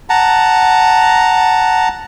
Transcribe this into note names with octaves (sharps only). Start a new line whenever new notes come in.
F#5 A5 A#5